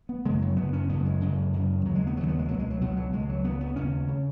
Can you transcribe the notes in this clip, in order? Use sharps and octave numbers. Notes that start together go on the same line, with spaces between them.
B3
F#2 C#3 G#3
F#3
F#2 C#3 B3
C#4
F#2 C#3 B3
G#3
F#2 C#3
F#2 C#3
D#2 C#3 F#3
G#3
B3
D#2 C#3 F#3
B3
G#3
C#2 B2 F#3
G#3
F#3
C#2 B2 F#3
F#3
C#2 C#3 G#3
F#3
C#2 C#3 B3
B3
D#2 C#3 C#4
C#3